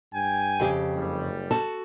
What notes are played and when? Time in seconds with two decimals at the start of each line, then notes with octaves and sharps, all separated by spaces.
0.13 G2 G5 G#5
0.60 F2 C#3 G4
0.95 F#1 F#2 G3
1.51 F#4 A4 A5